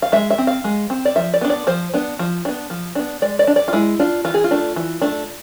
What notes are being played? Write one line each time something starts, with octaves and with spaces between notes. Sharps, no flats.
F5
G#3 E5
E5
C4
F5
G#3
C4
D5
F3 E5
D5
B3 D4
D5
F3 C5
B3 D4
F3
B3 D4
F3
B3 D4
G#3 D5
D5
D4
D5
F4
G#3 E4
D4 F4
E3 F4
G#4
F4
A3 D4
E3
A3 D4